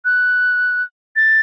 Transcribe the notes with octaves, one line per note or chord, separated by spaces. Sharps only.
F#6
A6